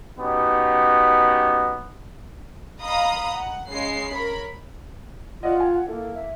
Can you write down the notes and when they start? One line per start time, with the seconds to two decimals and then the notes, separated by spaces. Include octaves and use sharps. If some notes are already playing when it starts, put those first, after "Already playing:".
0.18 B3 C#4 D#4 F#4 G4
2.81 D#5 F5 A#5 B5 D#6
3.36 F#5
3.70 C#3 G#3 C7
4.10 A#4 C#5 B5
5.43 F4 D5 D#5 F#5
5.60 G5 G#5
5.74 F#5
5.88 A#3 E4 A4
6.15 E5